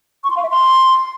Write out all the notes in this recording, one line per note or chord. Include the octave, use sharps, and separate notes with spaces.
C#6
C6
F5
E5
C6